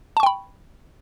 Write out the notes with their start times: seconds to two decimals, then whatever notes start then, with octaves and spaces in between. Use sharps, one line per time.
0.17 A5
0.20 C#6
0.23 G5
0.26 B5